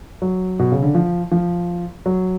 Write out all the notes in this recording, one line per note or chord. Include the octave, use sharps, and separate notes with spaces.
F#3
B2
C#3
D3
F3
F3
F#3